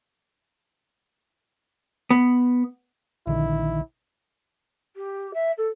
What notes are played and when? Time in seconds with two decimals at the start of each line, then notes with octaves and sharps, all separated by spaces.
2.10 B3
3.27 A#1 D3 D#3 E4
4.96 G4
5.34 E5
5.58 A4